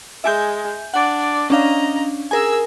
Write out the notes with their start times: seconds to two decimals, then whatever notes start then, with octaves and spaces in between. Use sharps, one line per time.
0.24 G#3 E5 G#5 G6
0.94 D4 D5 F#5
1.50 C#4 D4 D#5 F5 A#5
2.31 G#4 A#4 G#5 E6